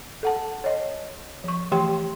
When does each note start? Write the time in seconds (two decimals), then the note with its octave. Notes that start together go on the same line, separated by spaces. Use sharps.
0.23 A4 F#5 A5
0.64 C#5 D#5
1.44 F3 C#6
1.72 E3 A3 G4 G5 C6